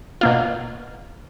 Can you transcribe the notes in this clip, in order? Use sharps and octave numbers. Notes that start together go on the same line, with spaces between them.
B2 A#3 F4